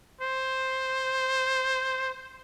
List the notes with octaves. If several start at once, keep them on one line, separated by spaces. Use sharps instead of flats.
C5